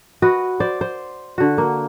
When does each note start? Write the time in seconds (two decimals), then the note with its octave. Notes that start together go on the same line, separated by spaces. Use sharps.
0.22 F#4 B4 D#5
0.60 C5 D5
0.81 C5
1.38 D3 F#4
1.58 A#3